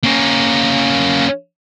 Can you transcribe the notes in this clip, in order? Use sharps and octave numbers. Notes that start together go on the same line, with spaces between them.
A#3 C#4